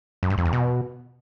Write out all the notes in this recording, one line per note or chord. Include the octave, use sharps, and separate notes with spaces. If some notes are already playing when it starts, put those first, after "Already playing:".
F#2
G2
F2
E2
B2